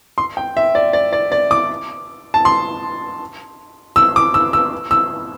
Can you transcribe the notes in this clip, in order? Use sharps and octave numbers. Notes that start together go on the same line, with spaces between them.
C6
G5
E5
D5
D5
D5
D5
D6
A5
C6
E6
D6
E6
E6
E6